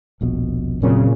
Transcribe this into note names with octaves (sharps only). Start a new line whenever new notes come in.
D#1 A#1 B2
F1 A#2 C#3 F#3 C4